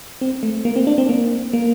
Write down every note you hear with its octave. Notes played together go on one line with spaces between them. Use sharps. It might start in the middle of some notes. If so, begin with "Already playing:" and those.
C4
A3
A#3
C4
D4
C4
A#3
A#3